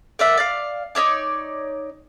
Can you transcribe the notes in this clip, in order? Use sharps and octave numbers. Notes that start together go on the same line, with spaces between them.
A#4 D5 E5 F#5
D5 F5
D#4 E4 C#5 D5